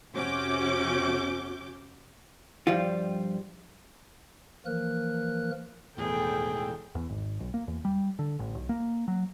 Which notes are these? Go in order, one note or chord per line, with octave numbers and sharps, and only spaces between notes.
F2 C3 C#4 F#4 D6 G6
G2 F3 G3 F4
E3 F3 A#3 A#4 F#6
E1 E2 A2 D#3 E3 G#4 A4 G5
E2
G#1
B1
A#3
E2
G3
D3
A1
B1
A#3
F#3